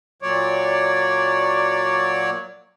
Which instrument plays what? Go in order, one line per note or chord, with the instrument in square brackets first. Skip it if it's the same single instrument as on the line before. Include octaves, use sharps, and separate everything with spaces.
[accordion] A#2 F#3 C#5 D5